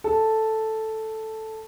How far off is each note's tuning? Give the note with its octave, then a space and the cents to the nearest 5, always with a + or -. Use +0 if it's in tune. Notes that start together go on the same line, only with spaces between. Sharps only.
A4 +0